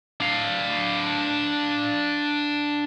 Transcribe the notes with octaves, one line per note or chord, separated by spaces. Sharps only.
D4 F5